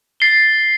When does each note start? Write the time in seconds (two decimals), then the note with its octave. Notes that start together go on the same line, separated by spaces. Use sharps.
0.20 A6 C7 G7